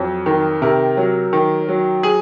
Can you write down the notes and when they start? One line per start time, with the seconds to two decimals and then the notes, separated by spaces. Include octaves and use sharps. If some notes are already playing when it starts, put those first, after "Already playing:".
Already playing: F2 F#3
0.26 D#3
0.62 C3 A#4
0.97 F#3
1.33 D#3
1.69 F#3
2.03 G#4